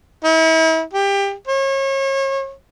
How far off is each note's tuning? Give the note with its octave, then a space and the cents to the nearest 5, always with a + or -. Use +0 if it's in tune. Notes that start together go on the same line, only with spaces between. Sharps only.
E4 -40
G4 +20
C#5 -35